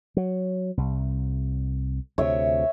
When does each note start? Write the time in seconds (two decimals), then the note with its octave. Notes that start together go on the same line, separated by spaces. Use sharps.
0.17 F#3
0.77 C2
2.18 D2 C3 C#5 E5